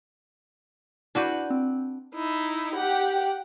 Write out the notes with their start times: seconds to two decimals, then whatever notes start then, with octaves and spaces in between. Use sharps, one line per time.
1.15 D4 E4 F#4 B4 D6 G6
1.50 C4
2.14 D#4 E4
2.75 G4 F#5